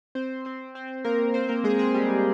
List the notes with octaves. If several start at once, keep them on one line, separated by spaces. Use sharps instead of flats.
C4 C5
C4 C5
C4 C5
A#3 A#4
C4 C5
A#3 A#4
G#3 G#4
G#3 G#4
G3 G4